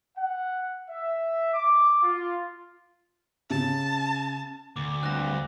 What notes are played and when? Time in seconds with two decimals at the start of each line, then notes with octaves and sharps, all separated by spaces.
0.17 F#5
0.88 E5
1.53 D6
2.03 F4
3.50 C#3 A5
4.76 D2 D6
5.03 G2 C4 F#6 A#6